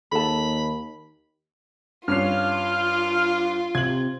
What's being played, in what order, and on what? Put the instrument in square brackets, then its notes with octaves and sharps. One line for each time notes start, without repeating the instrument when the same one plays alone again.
[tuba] D#2 [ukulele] A4 A5 [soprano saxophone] B5
[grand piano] G2 C#4 C7 [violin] F4 [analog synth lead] F6
[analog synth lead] C3 [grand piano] G#6 F#7